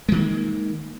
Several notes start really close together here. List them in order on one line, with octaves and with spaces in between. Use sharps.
G#3 D#3 C4 A#3